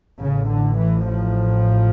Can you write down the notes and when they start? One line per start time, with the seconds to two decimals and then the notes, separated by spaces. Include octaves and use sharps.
0.20 A1 A2 C#3
0.49 D3
0.77 E3
1.06 F3